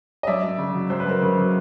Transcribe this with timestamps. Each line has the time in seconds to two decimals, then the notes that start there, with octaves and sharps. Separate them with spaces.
0.23 D#5
0.27 F#2 D5 E5
0.43 F#2
0.58 C#3
0.75 F#3
0.90 F#2 C5
1.00 B4
1.06 F#2 A#4 C5
1.22 C#3
1.38 F#3